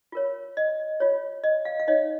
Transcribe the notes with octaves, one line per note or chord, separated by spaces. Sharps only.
F4 A#4 C#5
D#5
F4 C#5
D#5
F5
F5
D#4 C#5 D#5